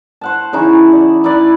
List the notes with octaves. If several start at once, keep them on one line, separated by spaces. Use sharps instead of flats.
C5 F#5 A5
C#3 E3 D#4 C#5
D5
D#4 E4 B4 D5